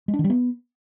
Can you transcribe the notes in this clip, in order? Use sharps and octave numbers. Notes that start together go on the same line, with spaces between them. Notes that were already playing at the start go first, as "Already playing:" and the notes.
G#3
D4
D#3
G3
B3